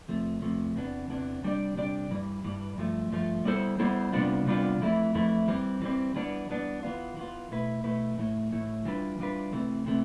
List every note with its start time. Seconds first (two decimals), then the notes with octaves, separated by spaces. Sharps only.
0.08 E2 C3 F3 A3
0.42 E2 C3 F3 A3
0.76 E2 C3 E3 B3 D4
1.10 E2 C3 E3 B3 D4
1.43 C3 G3 D4 G4 D5
1.77 C3 G3 D4 G4 D5
2.11 G2 E3 G3
2.44 G2 E3 G3
2.78 G2 F3 A3
3.12 G2 F3 A3
3.45 G3 B3 E4 A4 C5
3.80 G3 B3 E4 A4 C5
4.13 C3 G3 B3 D4 F4
4.46 C3 G3 B3 D4 F4
4.81 F2 E3 A3 E4
5.14 F2 E3 A3 E4
5.48 E3 G3 C4
5.82 E3 G3 C4
6.16 E3 G3 B3 D4
6.49 E3 G3 B3 D4
6.83 E3 B3 F4
7.17 E3 B3 F4
7.51 B2 A3 E4 B4
7.84 B2 A3 E4 B4
8.18 A2 E3 A3 E4
8.52 A2 E3 A3 E4
8.85 E3 G3 D4 F4 B4
9.19 E3 G3 D4 F4 B4
9.53 C3 E3 A3
9.86 C3 E3 A3